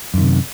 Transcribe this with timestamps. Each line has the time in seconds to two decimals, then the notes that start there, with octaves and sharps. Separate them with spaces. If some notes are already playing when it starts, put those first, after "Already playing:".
0.14 F#2
0.18 D#3
0.22 C3